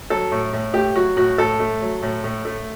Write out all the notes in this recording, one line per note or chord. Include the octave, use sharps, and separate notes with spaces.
F#3 A4
A2
A2
A3 G4
F#3 F#4
A2 F#4
A2 A4
A3
F#3
A2
A2
A3